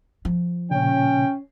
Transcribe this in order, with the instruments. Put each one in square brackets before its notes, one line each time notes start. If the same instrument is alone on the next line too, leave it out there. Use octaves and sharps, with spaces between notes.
[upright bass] F3
[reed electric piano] A#2 C#3 [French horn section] C#4 [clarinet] G5